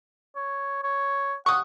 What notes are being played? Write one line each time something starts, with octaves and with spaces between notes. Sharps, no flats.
C#5
C#5
F#5 C#6 D#6